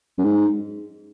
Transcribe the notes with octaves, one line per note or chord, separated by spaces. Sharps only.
F#2
G#2